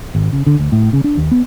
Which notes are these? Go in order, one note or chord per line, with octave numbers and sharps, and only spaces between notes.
G#1
C#3
D3
D2
A2
C#3
D4
D#2
B3